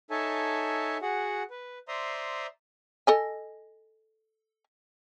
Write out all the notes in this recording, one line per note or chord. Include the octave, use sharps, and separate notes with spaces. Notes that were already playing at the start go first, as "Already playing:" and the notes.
D#4 A4 C#5 E5 G#5 A5
F#4 G#4 F#5
B4
C5 D5 E5 A#5 C6 D#6
A4 D#5 G#5